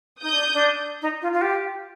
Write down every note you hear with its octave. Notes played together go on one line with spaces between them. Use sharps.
D#4 D#6 G6
D4
D4
D#4
F4
F4
G4